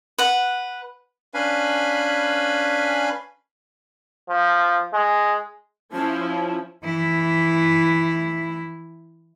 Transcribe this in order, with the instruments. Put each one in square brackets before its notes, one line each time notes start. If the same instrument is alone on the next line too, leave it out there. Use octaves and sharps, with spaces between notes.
[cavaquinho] B4 F#5
[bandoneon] C#4 D4 B4 F5 G#5 B5
[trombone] F3
G#3
[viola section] F3 C#4 E4 [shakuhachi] A5
[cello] E3 E4